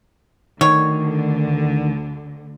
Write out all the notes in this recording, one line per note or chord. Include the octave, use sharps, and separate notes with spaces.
D2 D3 D#3 C#5